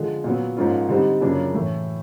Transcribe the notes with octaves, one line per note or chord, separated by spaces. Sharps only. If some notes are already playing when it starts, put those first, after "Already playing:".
Already playing: D3 F3 G#3
A#2 F#3 B3
G#2 F3 A#3 C#4 F4
D3 G3 C4 D#4
F#2 C#3 F3 A#3 D4
A2 E3 A3